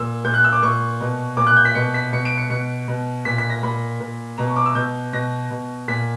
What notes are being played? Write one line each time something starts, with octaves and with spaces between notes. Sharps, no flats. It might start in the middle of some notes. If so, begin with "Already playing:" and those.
Already playing: A#2 E6
A#2 G6
F#6
E6
D6
A#2 C#6
B2
A#2 D6
F#6
G6
B6
B2 C#7
B6
B2 C#7
D7
C#7
B2 C#7
B2
A#2 B6
B6
A#6
A#2 B5
A#2
B2 A#5
C#6
D6
E6
B2 G6
B2 A#6
B2
A#2 B6